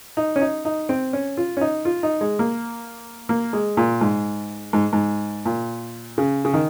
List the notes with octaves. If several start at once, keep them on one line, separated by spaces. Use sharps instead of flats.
D#4
C#4
D#4
D#4
C4
C#4
F4
C#4
D#4
F4
D#4
G#3
A#3
A#3
G#3
A#2
G#2
G#2
G#2
A#2
C#3
C#3
D#3